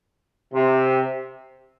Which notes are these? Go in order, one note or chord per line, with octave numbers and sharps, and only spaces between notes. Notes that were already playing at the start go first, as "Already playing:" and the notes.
C3